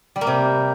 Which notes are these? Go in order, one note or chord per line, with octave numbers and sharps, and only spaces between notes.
G3
A#3
C3